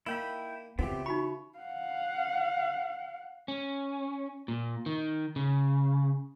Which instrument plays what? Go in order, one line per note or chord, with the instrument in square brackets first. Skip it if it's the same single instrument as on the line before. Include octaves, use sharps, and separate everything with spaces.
[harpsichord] A#3 D#4 [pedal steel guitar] E4 G5 B5
[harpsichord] C#3 E3 [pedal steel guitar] B3 C4 G4 [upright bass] F4
[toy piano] D#4 F#4 B5 [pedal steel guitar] C#6
[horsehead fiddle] F5 F#5
[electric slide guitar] C#4
A#2
D#3
C#3